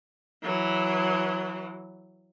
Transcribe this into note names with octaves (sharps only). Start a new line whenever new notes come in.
E3 F#3